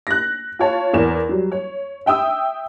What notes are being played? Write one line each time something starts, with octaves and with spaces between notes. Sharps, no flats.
F#6 A#6
F4 C#5 A5
E2 A#4 E7
F#3 G3
C#5
E5 G5 D#6 E6